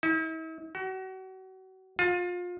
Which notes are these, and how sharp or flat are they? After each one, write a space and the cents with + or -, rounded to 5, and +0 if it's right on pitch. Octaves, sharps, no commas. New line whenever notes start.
E4 -45
F#4 +35
F4 +30